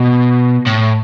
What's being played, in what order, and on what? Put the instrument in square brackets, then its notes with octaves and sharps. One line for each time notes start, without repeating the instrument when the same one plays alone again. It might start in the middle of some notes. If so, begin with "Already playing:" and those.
Already playing: [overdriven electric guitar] B2
A2